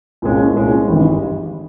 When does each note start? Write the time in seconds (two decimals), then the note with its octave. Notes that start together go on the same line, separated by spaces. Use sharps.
0.22 C2 A#2 G#3 C#4
0.55 C2 A#2 G#3 C#4
0.88 G#1 G2 G3